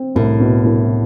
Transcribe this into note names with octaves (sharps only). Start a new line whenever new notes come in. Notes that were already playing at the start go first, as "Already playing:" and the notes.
Already playing: C4
C2 A2
B2
C2